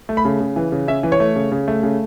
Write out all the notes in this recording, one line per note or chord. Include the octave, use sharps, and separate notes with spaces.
A3
B5
C#3
C#3
E3
C#3
C#4 E5
E3
C#5
A3
C#3
C#3
A3
C#3